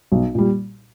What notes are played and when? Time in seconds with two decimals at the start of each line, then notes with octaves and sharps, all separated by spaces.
0.12 B1
0.35 A#2 G3